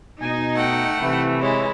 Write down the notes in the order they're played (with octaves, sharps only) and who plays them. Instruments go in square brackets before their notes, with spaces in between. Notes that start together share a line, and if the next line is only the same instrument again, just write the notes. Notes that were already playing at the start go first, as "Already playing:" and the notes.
[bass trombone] B2 [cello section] D#4 [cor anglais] G#5
[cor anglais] A3 [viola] F#5 G5
[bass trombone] C3 [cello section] E3
[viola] G#3 E4 [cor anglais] C#5